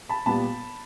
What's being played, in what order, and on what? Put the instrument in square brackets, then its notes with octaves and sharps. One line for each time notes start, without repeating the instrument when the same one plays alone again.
[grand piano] A5 B5
A#2 G3 B3 A5 B5